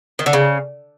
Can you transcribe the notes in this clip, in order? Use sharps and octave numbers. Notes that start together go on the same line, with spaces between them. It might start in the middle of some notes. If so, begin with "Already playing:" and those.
D#3
D3
C#3